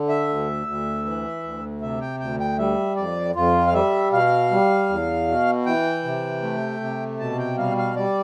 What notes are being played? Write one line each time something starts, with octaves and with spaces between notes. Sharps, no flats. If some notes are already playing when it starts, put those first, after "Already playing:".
Already playing: D3
E5
D2
D2
E3
D2
C3 E5
G5
D2 G5
G5
G3 E5
F2 D5
F2 F4
F5
G3 E5
B2 F5
G3
E2
B2
E3 G5
C3
A3
C3
B2 A5
G5
G3 F5
F5
G3 D5